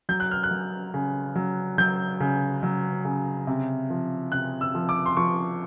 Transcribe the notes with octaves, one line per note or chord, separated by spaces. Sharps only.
F#3 G6
F#6
F6
F#6
F#3
C#3
F#3
F#3 G6
C#3
F#3
C#3
C3
F3
C3 F#6
E6
F3
D6
C6
F3 C#6